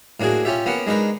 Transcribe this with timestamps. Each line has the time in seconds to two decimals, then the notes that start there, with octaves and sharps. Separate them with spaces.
0.20 A2 A#3 D4 F#4 G#4
0.45 C#4 F4 G4 E5
0.66 A#3 B3 C#4 F#5
0.87 G#3 D4 D#4 A#4 B4